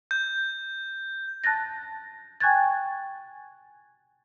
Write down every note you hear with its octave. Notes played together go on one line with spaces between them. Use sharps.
G6
A5 F#6 A6 A#6
G5 G#5 C#6 F#6 G#6 A6